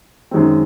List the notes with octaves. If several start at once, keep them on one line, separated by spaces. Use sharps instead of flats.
F#2 D#3 G#3 C4